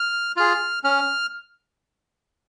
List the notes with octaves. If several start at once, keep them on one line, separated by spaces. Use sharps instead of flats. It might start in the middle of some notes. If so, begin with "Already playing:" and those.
Already playing: F6
F4 G#4 F6
C#4 F6